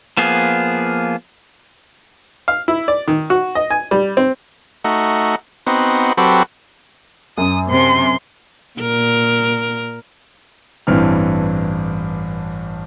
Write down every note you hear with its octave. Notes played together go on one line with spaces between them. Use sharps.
F3 A#3 B3 G#4
F5
E4
D5
D#3
F#4
D#5
G#5
G3
C4
A3 D#4 F#4
B3 C4 D#4 F#4
F#3 C4 F#4 G4 A4 B4
F#2 D#6
C3 C6
A#2 A#4
A1 G2 E3 C4 D4 F6